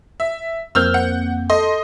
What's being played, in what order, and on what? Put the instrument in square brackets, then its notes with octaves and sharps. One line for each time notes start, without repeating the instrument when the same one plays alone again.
[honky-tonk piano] E5
[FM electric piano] F2 A#3 C4 [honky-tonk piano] E6 F6 G6
[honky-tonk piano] F#5
[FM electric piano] A4 [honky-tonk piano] D#5 C6